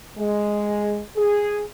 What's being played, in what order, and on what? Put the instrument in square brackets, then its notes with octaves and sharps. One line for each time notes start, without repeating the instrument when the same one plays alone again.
[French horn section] G#3
G#4